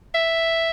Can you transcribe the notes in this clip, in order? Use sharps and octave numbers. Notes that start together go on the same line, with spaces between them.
E5